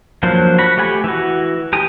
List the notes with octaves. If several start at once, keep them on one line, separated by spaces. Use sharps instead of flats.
F3 F#3 A#3 D4 C5
F#4 B5
A3 G4 F#5 G#5 B5
E3 F#4
G4 G5 G#5 D#6